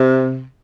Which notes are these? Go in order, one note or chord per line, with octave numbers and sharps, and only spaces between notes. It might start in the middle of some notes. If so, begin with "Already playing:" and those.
Already playing: C3